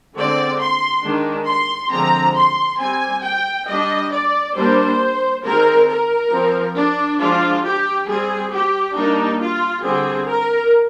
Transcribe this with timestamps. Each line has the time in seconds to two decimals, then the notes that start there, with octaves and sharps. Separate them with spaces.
0.16 D3 G#3 C4 D5
0.60 C6
1.04 D#3 G#3 D4
1.48 C6
1.92 D3 F3 G#3 C4 A#5
2.36 C6
2.79 G3 C4 G#5
3.23 G5
3.68 G3 D4 D#5
4.12 D5
4.55 G3 A#3 D4 C5
5.44 D#3 G#3 C4 A#4
5.88 A#4
6.32 F3 C4
6.76 D4
7.20 F3 G#3 D4 F4
7.64 G4
8.07 G3 C4 G#4
8.52 G4
8.95 G3 A#3 D4 D#4
9.40 F4
9.83 D3 G3 C4 G#4
10.28 A#4